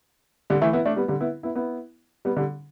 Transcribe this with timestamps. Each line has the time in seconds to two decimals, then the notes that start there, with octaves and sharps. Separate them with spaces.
0.50 D3 G3
0.61 E3 A3
0.73 B3 E4
0.85 A3 D4
0.96 G3 B3
1.08 D3 G3
1.20 B3 E4
1.43 B3 E4
1.55 B3 E4
2.25 G3 B3
2.37 D3 G3